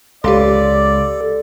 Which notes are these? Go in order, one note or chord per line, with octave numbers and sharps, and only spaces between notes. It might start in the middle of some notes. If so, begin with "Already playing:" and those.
C#2 G4 A4 D5 F5 C6